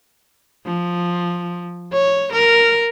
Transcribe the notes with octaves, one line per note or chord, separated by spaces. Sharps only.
F3
C#5
A#4